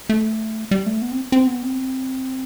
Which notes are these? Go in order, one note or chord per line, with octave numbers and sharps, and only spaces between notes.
A3
G3
A3
B3
C4
C4
B3
C4